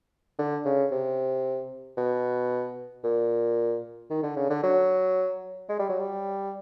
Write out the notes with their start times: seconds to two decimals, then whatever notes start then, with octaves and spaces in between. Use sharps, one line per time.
0.39 D3
0.65 C#3
0.91 C3
1.97 B2
3.04 A#2
4.10 D#3
4.23 D3
4.36 C#3
4.50 D3
4.63 F#3
5.69 G#3
5.79 G3
5.89 F#3
5.99 G3